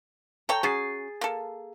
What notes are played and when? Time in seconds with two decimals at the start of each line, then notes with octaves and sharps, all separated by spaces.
0.49 A4 C#5 G5 A#5
0.63 C#4 F#4 G#4 A6 C7
1.21 A#3 A4